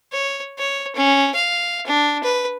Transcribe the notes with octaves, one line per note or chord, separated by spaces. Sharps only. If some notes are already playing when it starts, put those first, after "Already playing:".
C#5
C#5
C#4
F5
D4
B4